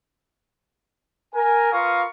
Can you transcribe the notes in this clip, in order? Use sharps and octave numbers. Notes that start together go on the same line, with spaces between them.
A#4 G#5
F4 A#4 B4 F5 C#6 D#6